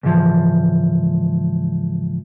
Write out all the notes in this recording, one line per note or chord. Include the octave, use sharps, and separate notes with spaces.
C#2 G#2 E3 F3